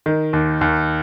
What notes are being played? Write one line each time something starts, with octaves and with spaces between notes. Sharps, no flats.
D#3
D#2
D#2